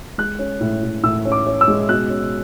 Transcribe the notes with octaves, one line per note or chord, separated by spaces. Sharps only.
G#3 F#6
C#4
A2
A2
A2 E6
C#4
D6
C#4
E6
G#3
B2 F#6
C#4